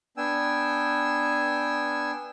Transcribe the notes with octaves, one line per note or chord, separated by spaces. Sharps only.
B3 D4 G5 G#5 E6